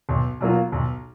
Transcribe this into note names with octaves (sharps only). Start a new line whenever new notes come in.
B1
B2 F#3 A#3 F4
B1